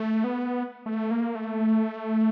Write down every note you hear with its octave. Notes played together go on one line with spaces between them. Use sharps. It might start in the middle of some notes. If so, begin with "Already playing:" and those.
Already playing: A3
B3
A3
A#3
A3